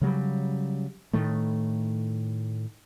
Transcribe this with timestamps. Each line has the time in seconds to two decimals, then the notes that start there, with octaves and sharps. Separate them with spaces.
0.01 C#3 F#3 G3
1.13 A2 D#3 A3